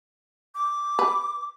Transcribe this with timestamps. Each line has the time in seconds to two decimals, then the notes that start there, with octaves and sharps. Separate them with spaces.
0.55 D6
0.99 B4